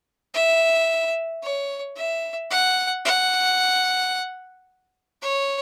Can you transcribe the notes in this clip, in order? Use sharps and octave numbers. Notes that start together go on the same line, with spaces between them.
E5
C#5
E5
F#5
F#5
C#5